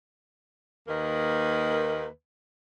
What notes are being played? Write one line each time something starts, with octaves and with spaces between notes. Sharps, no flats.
D#2 D#3 A#3 B4